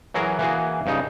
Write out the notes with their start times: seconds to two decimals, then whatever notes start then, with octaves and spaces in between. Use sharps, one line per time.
0.14 E3 F#3 F#4 G#4 A#4
0.39 E3 A#3 F#4 G#4
0.86 G2 C#3 D#4